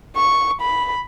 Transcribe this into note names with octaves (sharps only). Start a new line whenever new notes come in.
C#6
B5